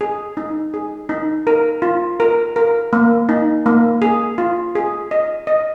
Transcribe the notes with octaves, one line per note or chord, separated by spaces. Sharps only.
G#4
D#4
G#4
D#4
A#4
F4
A#4
A#4
A#3
D#4
A#3
G#4
F4
G#4
D#5
D#5